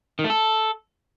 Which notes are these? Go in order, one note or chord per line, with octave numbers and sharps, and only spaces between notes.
D#3
A3
A4